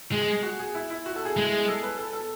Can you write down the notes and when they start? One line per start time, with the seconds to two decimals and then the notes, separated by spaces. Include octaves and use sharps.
0.12 G#3 G#4
0.22 G#4
0.43 F#4
0.59 G#4
0.75 E4
0.90 E4
1.06 F#4
1.16 A4
1.25 G#4
1.37 G#3 E4
1.52 G#4
1.68 A4
1.83 B4
1.98 A4
2.13 A4